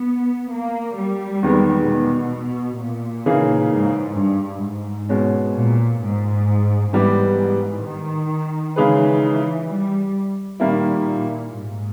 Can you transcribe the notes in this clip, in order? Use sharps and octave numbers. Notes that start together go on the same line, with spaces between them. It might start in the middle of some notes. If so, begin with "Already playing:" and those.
Already playing: B3
A#3
G3
E2 D#3 G#3 B3
B2
A#2
C#3 E3 A#3 D#4 G#4
G#2
G2
G#2
B2 G#3 C#4
A#2
G#2
G#2 E3 G3 B3 G4
D#3
C#3 E3 G#3 D#4 G#4 B4
G3
A#2 D#3 G3 A#3 E4
G#2